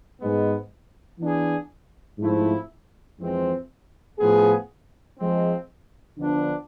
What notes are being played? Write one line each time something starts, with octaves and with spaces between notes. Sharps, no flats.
G#2 G#3 B3
E3 B3 D4 G#4
G#2 F3 A3 C4 E4
F2 E3 G#3 C4
A2 F3 B3 F4 G#4
F3 G#3 C4
D3 F3 B3 D4